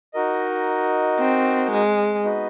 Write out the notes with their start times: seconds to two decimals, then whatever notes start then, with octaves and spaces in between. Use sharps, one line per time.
0.14 D#4 F#4 A#4 D#5
1.19 C4
1.72 G#3
2.24 B3 D#4 F#4 B4 D#5